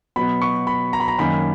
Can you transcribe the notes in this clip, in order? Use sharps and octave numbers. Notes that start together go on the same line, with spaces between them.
B2 F#3 B3 B5
C#6
B5
A#5
B5
A#5
F#2 D#3 A#3 C#4 B5